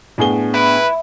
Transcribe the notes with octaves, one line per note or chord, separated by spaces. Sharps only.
A2 B3 D4 G#4 G7
E4 B4